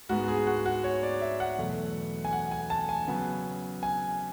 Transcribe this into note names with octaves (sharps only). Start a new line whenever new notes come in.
G#2 G#3 B3 F#4
G#4
F#4
F#4
C#5
D5
E5
F#5
E2 B2 F#3 A3
G#5
F#5
G#5
A5
G#5
C#3 F#3 B3
G#5